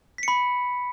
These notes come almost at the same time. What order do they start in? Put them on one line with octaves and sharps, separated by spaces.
B6 C#7 B5